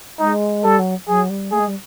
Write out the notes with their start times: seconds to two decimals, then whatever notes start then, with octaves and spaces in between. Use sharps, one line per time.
0.19 G#3 D#4
0.64 G3 A4
0.78 F#3
1.07 F#3 G#4
1.29 G3
1.52 A3 G#4
1.59 G#3
1.67 G3